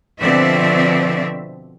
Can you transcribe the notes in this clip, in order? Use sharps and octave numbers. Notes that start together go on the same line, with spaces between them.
B2 D3 F3 C4 D5 E5